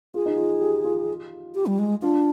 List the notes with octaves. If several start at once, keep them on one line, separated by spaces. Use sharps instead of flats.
F4 G#4
D#4
F4
G4
F4
G4
G3
G#3
D4 F4